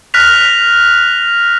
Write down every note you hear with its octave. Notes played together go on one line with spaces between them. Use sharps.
F6 F#6 A#6 B6 F7